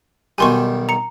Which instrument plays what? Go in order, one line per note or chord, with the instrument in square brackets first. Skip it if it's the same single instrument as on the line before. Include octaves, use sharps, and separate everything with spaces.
[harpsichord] B1 D#3 G3 [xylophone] G#5 C6 C#6
[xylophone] A#5 C#7